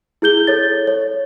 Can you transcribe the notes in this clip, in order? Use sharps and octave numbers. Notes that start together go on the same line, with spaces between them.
E4 G#4 G6 G7
A4 C#5 A6
C#5